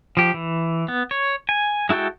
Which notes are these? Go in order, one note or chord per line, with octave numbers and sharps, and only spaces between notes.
F3 G4
E3
B3
C#5
G#5
G#3 E4 F#4 A4 G5